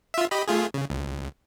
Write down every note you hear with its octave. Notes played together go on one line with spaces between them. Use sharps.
F4 E5
G4 D#5 B5
A3 F4 G#4
C#3
C#2